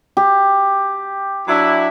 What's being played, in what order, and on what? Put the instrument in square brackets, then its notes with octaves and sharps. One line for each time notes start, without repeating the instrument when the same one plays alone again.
[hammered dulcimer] G4
[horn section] F#3 D4 E4